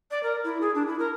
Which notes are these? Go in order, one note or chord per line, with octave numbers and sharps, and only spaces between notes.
D5
A#4
E4
G#4
D4
E4
A#4